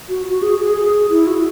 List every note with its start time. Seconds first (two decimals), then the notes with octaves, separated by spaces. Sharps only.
0.09 F#4
0.26 F#4
0.42 G#4
0.60 G#4
0.77 G#4
1.10 E4
1.27 F#4